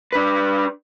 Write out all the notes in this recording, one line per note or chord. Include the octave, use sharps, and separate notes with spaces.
D4 B4